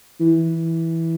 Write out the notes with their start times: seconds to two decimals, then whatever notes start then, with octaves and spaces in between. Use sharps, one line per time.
0.20 E3